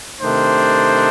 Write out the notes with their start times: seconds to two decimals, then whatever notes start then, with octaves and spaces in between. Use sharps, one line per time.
0.21 C3 D#3 A3 D4 C5